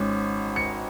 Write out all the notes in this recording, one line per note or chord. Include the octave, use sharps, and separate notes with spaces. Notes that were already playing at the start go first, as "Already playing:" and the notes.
Already playing: G#1 G#2 C#4
C#7